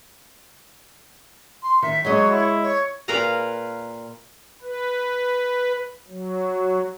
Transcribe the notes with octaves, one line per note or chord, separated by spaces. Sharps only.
C6
D#3 E5
F#3 G#3 C#5 D#5
E4
C#5
A#2 A#4 B4 F5 G#5 A#5
B4
F#3